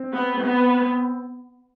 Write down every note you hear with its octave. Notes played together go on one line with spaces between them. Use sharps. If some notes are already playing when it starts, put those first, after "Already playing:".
Already playing: C4
B3
B3